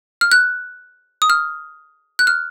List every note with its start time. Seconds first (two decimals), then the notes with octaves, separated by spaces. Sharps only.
0.21 F6
0.32 F#6
1.22 D#6
1.30 F6
2.19 F#6
2.27 F6